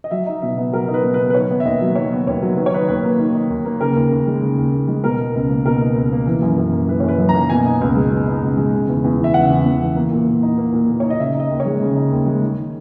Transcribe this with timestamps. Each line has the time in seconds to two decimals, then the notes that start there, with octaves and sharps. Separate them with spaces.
0.04 D#5
0.11 F#3 E5
0.26 D#4
0.42 B2 E5
0.57 B3
0.72 F#3 A#4
0.88 D#4
0.94 B4
1.04 B2
1.14 B4
1.20 B3
1.30 B4
1.34 D#3 C#5
1.50 B3
1.60 E5
1.65 D#2 D#5
1.81 F#3
1.95 D#3 C#5
2.12 B3
2.27 D#2 C#5
2.42 F#3
2.57 D#3 B4
2.66 C#5
2.73 D#4 B4
2.88 D#2 B4
3.04 A#3
3.19 D#3
3.34 D#4
3.50 D#2
3.65 A#3
3.80 C#3 A#4
3.96 D#2
4.12 D#2
4.27 G#3
4.42 C#3
4.58 D#2
4.73 D#2
4.88 G#3
5.04 B2 A#4
5.20 D#4
5.35 C#2
5.50 A#3
5.66 B2 A#4
5.81 D#4
5.96 C#2
6.12 A#3
6.26 E3
6.42 F#2
6.58 F#2
6.72 A#3
6.88 E3 B4
7.00 F#2 C#5
7.08 B4
7.19 F#2
7.29 A#5
7.34 A#3
7.50 B2 G#5
7.65 D#4
7.81 C#2
7.96 G#3
8.11 B2
8.27 D#4
8.43 C#2
8.58 G#3
8.73 C#3
8.89 E2
9.04 E2
9.19 E3
9.24 E5
9.34 C#3 F#5
9.49 E2
9.65 E2
9.81 E3
9.96 A#3
10.12 A#2
10.27 A#2
10.43 D#4
10.58 A#3
10.73 A#2
10.89 A#2
11.00 D#4 C#5
11.10 D#5
11.19 C#3 E5
11.35 D#4
11.40 D#5
11.51 D#2
11.60 C#5
11.66 G#3
11.81 C#3
11.96 D#4
12.12 D#2
12.26 G#3
12.43 D#3